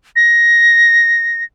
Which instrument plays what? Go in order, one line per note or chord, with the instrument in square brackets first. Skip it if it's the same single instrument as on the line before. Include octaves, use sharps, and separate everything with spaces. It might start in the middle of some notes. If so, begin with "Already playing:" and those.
[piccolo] A#6